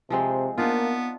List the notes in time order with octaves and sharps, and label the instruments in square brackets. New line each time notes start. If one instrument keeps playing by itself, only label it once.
[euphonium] C3 [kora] F3 G#3 C4
[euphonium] A#3 [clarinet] B3 [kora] D4 D#4 F4